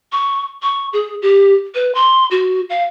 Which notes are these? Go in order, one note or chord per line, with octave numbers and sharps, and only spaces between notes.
C#6
C#6
G#4
G4
B4
C6
F#4
F5